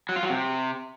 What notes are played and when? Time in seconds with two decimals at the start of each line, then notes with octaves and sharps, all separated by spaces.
0.09 F#3
0.16 F4
0.23 F#3
0.30 C3